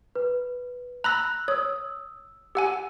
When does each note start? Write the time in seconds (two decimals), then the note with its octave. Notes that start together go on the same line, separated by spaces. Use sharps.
0.15 B4
1.04 A#5 B5 E6 F#6 A#6
1.48 C#5 D#6 E6
2.55 G4 F#5 G#5 E6